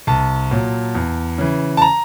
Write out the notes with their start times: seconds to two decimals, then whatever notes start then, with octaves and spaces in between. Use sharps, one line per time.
0.07 C2 A5
0.51 A#2 F#3
0.95 E2
1.38 C#3 E3
1.77 A5
1.82 A#5